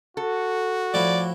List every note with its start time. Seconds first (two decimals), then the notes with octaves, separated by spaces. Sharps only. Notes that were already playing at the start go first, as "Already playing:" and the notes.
0.17 F#4 A4
0.94 A2 F3 E4 D5